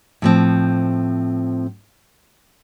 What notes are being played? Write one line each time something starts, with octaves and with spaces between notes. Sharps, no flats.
A2 F3 C4